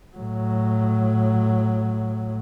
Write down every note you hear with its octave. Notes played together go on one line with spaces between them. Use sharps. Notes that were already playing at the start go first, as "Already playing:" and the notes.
A2 F#3